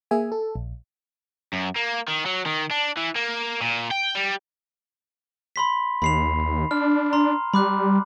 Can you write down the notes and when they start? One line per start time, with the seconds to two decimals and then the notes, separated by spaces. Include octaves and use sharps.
0.11 A#3 G#4 E5 G#5
0.32 A4
0.55 A#1
1.53 F#2
1.76 A#3
2.08 D#3
2.26 F#3
2.46 D#3
2.71 D4
2.97 E3
3.15 A#3
3.61 A#2
3.91 G5
4.15 G3
5.56 B5 C6 B6
6.02 D#2 B5 C7 F7
6.71 D4 F6
7.13 A#5 C6
7.53 G3 B5 D6 F#6